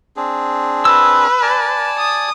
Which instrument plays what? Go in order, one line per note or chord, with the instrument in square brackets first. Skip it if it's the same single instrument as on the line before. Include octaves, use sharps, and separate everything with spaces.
[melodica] C4 D4 G#4
[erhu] B4 [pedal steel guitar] E6
[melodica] D5 G#5 A5
[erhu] D#6